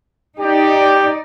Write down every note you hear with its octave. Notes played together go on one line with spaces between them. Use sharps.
D#4 G4 D5